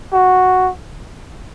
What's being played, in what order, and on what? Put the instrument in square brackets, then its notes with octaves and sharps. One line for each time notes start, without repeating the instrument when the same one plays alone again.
[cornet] F#4